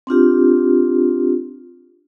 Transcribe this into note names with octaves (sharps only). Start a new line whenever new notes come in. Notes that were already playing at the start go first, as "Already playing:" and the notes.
C4 D4 F4 G4